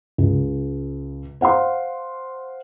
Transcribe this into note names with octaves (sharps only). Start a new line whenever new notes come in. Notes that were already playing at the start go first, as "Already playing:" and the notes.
C#2
C5 F5 F#5 C6